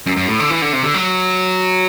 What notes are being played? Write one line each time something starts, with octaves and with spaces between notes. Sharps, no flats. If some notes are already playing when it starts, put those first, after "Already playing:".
F#2
F#2
A2
D3
E3
D3
C3
D3
F#3